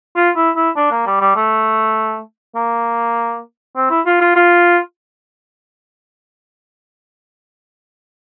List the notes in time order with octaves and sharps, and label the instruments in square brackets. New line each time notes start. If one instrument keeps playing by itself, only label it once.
[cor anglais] F4
E4
E4
D4
A#3
G3
G3
A3
A#3
C4
E4
F4
F4
F4